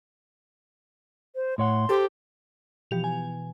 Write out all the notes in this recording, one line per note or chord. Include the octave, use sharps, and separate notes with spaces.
C5
A2 C#5 F#5 C6
G4 A4 C5
B2 E3 F3 G4 F7
G#5